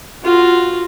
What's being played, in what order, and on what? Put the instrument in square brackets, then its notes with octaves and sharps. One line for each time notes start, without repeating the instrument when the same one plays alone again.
[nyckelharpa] F4 F#4